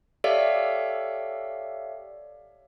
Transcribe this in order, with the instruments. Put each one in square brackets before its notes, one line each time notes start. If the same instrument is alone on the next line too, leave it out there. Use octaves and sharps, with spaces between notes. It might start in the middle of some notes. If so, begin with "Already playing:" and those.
[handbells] G4 A4 C#5 D5 E5 F5